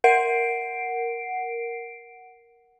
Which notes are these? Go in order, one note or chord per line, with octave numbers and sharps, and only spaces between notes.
A#4 F#5 C7 D7